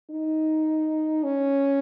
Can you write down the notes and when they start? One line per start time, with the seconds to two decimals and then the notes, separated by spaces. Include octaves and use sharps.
0.11 D#4
1.23 C#4